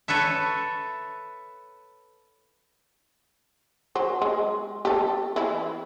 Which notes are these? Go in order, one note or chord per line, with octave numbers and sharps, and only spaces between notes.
A4 B4 C#5 E5
F#3 C5
G#3
G4 A4
E3 E4